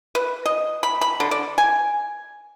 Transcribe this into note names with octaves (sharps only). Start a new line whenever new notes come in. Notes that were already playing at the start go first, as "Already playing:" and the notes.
B4
D#5
B5
B5
D3
D5
G#5